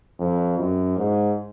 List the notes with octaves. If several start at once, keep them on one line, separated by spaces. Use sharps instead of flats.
F2
F#2
G#2